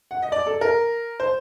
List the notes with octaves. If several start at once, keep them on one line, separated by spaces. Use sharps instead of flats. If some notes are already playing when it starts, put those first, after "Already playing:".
F#5
D#5
D5
A4
A#4
C5